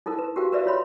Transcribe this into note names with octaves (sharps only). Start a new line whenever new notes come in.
D#4 E4 A4 A#4
B4
F#4 G4 A#4 F5 G5
A#4 B4 D5 E5 F5
F4 C#5 B5 C6